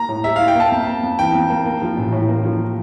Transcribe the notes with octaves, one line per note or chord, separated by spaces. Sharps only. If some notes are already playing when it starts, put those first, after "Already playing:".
Already playing: A#3 A#5
A2
G3 E5
E4 F5
G5
A#3 A5
F2
A#3
F2
E3 G5
F2
A#3
A#3
F3
A1
A2
A#3
F3